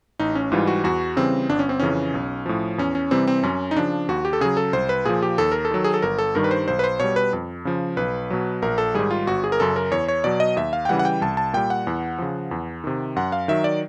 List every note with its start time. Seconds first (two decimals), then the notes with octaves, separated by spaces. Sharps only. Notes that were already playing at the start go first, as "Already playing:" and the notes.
0.19 A1 D#4
0.35 C#4
0.52 G#2 E3 G3 F4
0.67 F#4
0.84 E2 F#4
1.16 C#3 E3 G3 C4
1.49 G1 D4
1.59 C#4
1.69 C4
1.80 F2 C#3 E3 C#4
2.14 B1
2.46 A2 F3
2.78 E2 C#4
2.95 C#4
3.11 C3 E3 G3 C4
3.27 C4
3.43 F#2 C#4
3.71 D#4
3.76 C#3 F3 D4
4.08 D#2 F#4
4.25 G4
4.33 A4
4.41 C#3 F#3 G#4
4.57 A4
4.73 C2 C5
4.89 B4
5.05 A#2 F3 G#4
5.22 G4
5.38 D#2 A4
5.52 A#4
5.65 A4
5.71 D#3 F#3
5.84 G#4
5.94 A4
6.02 G1 A#4
6.19 A4
6.35 G2 D#3 G3 A#4
6.44 B4
6.51 C5
6.68 B1 C5
6.79 B4
6.84 C5
7.00 B2 G3 C#5
7.16 B4
7.33 F2
7.65 C#3 F3
7.97 B1 B4
8.30 B2 F#3
8.62 A#1 A#4
8.78 A4
8.95 G#2 D#3 G3 G#4
9.11 F4
9.27 G1 F#4
9.44 G#4
9.52 A#4
9.60 F#2 C#3 A4
9.76 A#4
9.91 E2 C#5
10.08 C#5
10.24 B2 F#3 D5
10.40 D#5
10.56 D#2 E5
10.73 F5
10.85 G5
10.89 C#3 E3 G3 F#5
10.99 F#5
11.05 G5
11.21 C2 A5
11.37 A5
11.53 A#2 G3 G5
11.70 F#5
11.87 E2
12.18 C#3 F3
12.51 E2
12.84 C3 D#3
13.16 F#2 F#5
13.32 F5
13.48 D#3 F#3 E5
13.64 D5